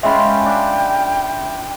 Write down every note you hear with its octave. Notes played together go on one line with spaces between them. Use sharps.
G#3 C#4 F4 E5 G5 B5
D4